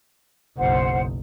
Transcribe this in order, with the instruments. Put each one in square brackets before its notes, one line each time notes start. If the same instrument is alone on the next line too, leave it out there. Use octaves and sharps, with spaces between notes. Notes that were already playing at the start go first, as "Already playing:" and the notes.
[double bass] F#1 B1 [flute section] C5 F#5